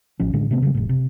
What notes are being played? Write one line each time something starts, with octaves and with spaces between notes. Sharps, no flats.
A1 F3 C#4
A2 D3 G#3
C3 A3 B3 C4
C#3 E3 G3
F1 A2
C3